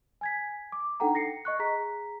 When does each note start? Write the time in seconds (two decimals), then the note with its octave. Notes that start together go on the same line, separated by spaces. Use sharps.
0.21 G#5 G#6 B6
0.72 D6
1.00 D4 D#4 A4 F#5 G5 A#5
1.15 A#6 C7 C#7
1.45 D#5 C#6 F#6
1.60 G#4 A#5 B6